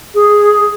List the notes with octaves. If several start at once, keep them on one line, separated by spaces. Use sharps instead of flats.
G#4